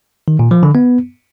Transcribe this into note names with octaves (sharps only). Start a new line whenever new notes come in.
D#3
A#2
F3
D3
B3